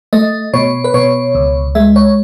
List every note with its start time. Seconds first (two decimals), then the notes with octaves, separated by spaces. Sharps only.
0.13 A3 D#5
0.54 B2 C#5
0.84 B4
0.94 B2 C#5
1.35 C#2
1.75 G#3 E5
1.96 C#5